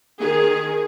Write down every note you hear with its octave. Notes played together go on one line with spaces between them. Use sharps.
D#3 G#4